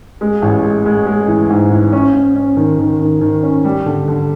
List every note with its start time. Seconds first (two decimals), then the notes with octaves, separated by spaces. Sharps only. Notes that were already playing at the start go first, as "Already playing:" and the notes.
0.21 G#3
0.42 A1
0.64 G#3
0.86 G#3
1.06 G#3
1.28 E3
1.50 G#2
1.72 E3
1.93 C#4
2.14 C#4
2.36 C#4
2.57 D#3
2.79 D#3
3.00 D#3
3.21 D#3
3.43 C#4
3.64 G3
3.86 D3
4.08 D3